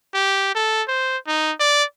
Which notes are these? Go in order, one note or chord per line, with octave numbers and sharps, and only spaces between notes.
G4
A4
C5
D#4
D5